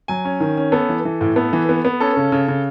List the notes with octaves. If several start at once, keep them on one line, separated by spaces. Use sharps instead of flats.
F#3 G#5
C#4
D#3
C#4
B3 A4
E3
E3
A2
B3 A4
E3
B3
B3
C#4 A4
C#3
C#3
C#3